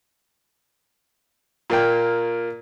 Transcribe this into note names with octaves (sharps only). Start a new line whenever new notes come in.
A#2 A#3 G5